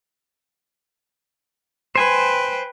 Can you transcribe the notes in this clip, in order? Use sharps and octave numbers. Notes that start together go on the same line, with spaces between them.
B4 C5 G5 G#5